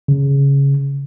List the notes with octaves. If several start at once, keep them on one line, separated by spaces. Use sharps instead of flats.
C#3